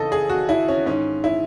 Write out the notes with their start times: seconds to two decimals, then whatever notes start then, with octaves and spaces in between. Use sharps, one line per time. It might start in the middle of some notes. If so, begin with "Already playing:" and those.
Already playing: D#2 C#3 E3 A4 D#5
0.12 G#4
0.29 F#4
0.49 E4
0.68 C#4
0.86 G#2 D#3 C#4
1.24 E4